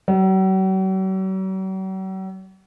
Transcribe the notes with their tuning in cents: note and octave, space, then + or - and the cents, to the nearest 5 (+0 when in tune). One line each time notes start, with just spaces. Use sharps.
F#3 +45